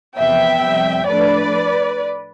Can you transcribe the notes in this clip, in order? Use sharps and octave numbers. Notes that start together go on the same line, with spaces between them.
E2 C3 F3 B3 E5 G5
F2 C3 G3
A2 F3 A3 D4 B4 D5